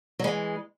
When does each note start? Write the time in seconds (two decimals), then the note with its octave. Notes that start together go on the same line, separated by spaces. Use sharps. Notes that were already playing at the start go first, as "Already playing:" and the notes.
0.19 F#3
0.24 E3 G#3